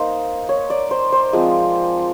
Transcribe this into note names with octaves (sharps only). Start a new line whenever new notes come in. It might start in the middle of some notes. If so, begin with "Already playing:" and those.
Already playing: A#3 D#4 C5
C#5
D5
C5
C5
F3 G#3 C4 F4